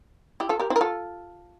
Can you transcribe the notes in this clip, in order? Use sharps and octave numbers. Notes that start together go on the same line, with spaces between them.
E4 G4
F4 A4
G4 A#4
C4 E4
A#4
F4 A4